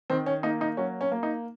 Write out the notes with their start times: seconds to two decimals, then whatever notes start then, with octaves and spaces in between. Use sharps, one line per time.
0.10 D#3 C4
0.26 C#4
0.43 A#3 D#4
0.61 D#4
0.77 F#3 C#4
1.01 C#4
1.12 A#3
1.23 D#4